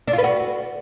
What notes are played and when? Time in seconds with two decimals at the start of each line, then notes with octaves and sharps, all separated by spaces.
0.08 D4
0.13 F4
0.18 B4
0.24 F#4